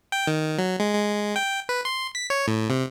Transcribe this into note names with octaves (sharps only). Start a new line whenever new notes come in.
G5
D#3
F#3
G#3
G#3
G5
B4
C6
B6
C#5
A2
C3